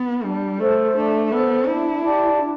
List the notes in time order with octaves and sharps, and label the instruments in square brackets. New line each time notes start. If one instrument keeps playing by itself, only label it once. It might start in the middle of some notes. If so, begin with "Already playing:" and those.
Already playing: [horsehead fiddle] B3
[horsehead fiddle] G3 [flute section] D4
[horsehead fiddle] A3 [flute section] A4 C5
[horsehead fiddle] A3 [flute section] D4
[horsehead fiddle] B3 [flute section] A4 C5
[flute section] D4 [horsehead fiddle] E4
[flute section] G4 D5 A5
D4